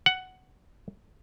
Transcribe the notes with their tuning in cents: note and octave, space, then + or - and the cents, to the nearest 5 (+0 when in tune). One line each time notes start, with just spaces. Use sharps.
F#5 +10